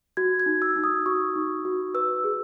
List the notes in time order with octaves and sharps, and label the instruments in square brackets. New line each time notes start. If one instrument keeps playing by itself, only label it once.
[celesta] F#4 G#6
G#6
D#4
E6
D#4
D#6
F#4 C#6
D#4
F#4
B4 E6
G#4